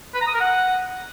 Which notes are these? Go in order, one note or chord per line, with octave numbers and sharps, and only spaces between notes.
B4
A#5
D#6
A#4
F#5